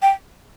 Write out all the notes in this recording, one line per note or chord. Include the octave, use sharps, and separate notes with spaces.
G5